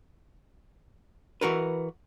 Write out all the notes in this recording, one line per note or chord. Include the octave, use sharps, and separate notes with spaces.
E3 F#4 A#4 B4